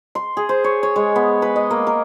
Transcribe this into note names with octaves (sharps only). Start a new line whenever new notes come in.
C6
G#4
C5
C#5
C#5
G#3
B3
B4
D#5
A#3
A#4